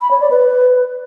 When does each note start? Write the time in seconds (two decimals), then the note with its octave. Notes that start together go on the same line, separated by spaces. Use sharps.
0.01 B5
0.11 C#5
0.21 D5
0.30 B4